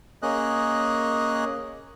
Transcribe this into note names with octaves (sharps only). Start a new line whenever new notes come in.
A#3 C#4 G#4 D#5 F#6